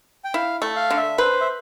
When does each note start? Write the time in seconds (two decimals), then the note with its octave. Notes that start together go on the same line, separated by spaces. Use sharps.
0.24 G5
0.34 E4 F5
0.62 A3
0.76 F5
0.90 D3
0.97 E5
1.18 B4 C5
1.41 E5